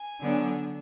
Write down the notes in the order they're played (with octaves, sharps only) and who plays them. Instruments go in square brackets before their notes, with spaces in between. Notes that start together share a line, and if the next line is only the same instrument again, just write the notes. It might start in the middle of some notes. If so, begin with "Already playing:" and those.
Already playing: [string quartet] G#5
D3 F#3 B3 D4